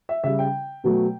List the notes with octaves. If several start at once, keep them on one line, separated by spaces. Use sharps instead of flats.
E5
C#3 G3 E5
G5
B2 F#3 A3